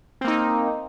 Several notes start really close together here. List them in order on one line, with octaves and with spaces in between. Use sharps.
C4 A#3 D#4